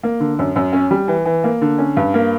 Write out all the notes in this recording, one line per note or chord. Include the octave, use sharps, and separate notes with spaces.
A#3
D3
F#2
F#2
C#4
G3
E3
E3
A#3
D3
C#4
G2
A#3